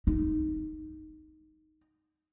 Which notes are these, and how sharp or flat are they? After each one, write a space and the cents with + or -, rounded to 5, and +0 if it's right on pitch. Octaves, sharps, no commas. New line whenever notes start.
D#4 +0